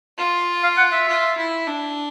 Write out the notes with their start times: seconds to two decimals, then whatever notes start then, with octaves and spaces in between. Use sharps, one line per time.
0.18 F4
0.64 F5
0.77 F#5
0.92 E5
1.08 F4
1.38 E4
1.67 D4